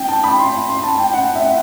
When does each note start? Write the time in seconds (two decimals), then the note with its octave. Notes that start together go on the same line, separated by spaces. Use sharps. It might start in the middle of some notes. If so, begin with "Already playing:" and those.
Already playing: G5
0.08 A5
0.24 B5
0.39 C6
0.69 C6
0.83 A5
0.99 G5
1.14 F#5
1.35 E5
1.44 F#5